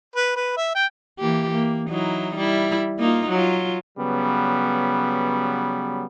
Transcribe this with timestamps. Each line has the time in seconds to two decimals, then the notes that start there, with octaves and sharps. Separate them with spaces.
0.16 B4
0.36 B4
0.57 E5
0.75 G5
1.19 E3 A#3 G4
1.52 A#3
1.89 F#3 D#4 E4
2.36 G3 E4
2.99 A#3 D#4 F4
3.30 F#3 F4
3.97 C#3 F#3 G3 B3